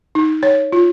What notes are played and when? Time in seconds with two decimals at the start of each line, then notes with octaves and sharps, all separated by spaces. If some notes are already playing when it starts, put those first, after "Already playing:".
0.15 D#4
0.43 C#5
0.72 F4